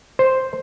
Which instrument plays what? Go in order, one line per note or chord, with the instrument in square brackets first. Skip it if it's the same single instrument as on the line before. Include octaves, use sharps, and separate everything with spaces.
[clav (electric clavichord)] C5